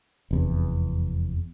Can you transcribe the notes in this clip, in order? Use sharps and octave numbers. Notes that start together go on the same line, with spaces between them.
F1 E2